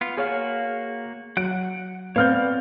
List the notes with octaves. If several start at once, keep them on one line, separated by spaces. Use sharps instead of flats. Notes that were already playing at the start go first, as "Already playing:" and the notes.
B3 F4
A#3 F#4 G#4 C#5 F5 F6
F#3 F#5 F#6 D7
B3 C4 C#5 D5 F5 F6 G6